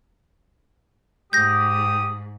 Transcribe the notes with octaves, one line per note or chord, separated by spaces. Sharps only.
G#2 G4 D#6 G6 A#6